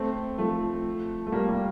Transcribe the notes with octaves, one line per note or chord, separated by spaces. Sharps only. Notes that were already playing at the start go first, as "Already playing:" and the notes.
Already playing: A3 C4
F3 A3
A3
G3 A#3
G3 A#3